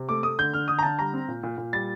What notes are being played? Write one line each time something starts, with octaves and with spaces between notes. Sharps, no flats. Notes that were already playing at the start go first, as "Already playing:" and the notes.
Already playing: C3
A3 D6
A3 D#6
D3 G6
D3 F6
D3 D#6
A#5
D3 A5
G3 A#5
C4
A#2
A#2
A#2
G3 A6